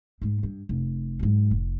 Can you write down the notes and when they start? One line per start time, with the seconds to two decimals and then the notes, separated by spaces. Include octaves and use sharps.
0.22 G#2 G#3
0.43 G2
0.69 F1
1.19 G#2 F#3
1.51 F1